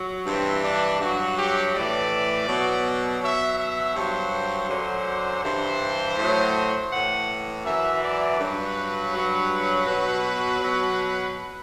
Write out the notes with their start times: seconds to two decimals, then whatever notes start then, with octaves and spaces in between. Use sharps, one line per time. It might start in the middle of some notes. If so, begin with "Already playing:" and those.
Already playing: F#3
0.25 G2 E3 C4
0.62 D4
0.99 G2 F#3 F#4
1.37 G4
1.73 A2 E3 D5
2.47 B2 F#3
3.21 B2 F#3 E5
3.58 E5
3.95 G2 F#3 C5
4.69 F#2 D3 F#3
5.43 G2 E3 C5
6.17 A2 F#3
6.91 A2 E3 F#5
7.65 F#2 E3 E5
8.02 D5
8.38 G2 F#3 B4
9.13 G2 F#3
9.86 B2 F#3
10.60 B2 F#3